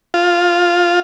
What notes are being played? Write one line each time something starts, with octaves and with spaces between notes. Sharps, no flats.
F4